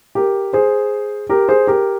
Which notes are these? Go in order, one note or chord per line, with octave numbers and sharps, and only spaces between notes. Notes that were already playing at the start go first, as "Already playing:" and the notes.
G4 A#4
G#4 C5
G4 A#4
G#4 C5
G4 A#4